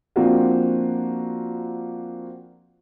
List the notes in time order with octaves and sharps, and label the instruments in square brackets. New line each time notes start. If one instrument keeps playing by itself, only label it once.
[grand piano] F3 A#3 C4 D4 F4 F#4